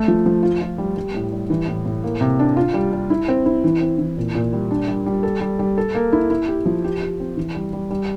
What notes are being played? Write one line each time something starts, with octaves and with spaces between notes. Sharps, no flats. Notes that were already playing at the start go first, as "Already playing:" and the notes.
Already playing: A3
F3
F3
F4
F4
G3
G3
A2
G3
E3
A2
A2
A#3
C3
D4
F4
G3
G3
E4
C4
E4
E3
C4
E3
A#2
A#2
G3
D4
G3
G3
A4
G3
G3
A4
A#3
E4
E4
G4
F3
G4
G4
C4
E3
G3
G3
G3